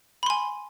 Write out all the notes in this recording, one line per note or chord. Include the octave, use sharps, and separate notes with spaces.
G#5 B5 C6